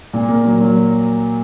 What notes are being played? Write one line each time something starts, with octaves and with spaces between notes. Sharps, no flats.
A#2
A#3
F#3
F#3